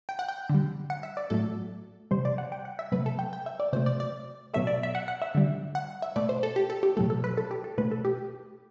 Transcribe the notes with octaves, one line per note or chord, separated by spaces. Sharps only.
G5
F#5
G5
D3 G3
F#5
E5
D5
A2 F#3 A3 A4
C3 G3 C5
D5
F#5
G5
F#5
E5
C3 F#3 A3 B4
A4
G5
G5
E5
D5
C3 F#3 A3 C5
D5
D5
B2 F#3 A3 E5
D5
E5
F#5
F#5
E5
D3 G3
F#5
E5
B2 A3 D5
C5
A4
G4
A4
G4
B2 F#3 A3 A4
A4
B4
A4
G4
A4
B2 A3 B4
A4
G4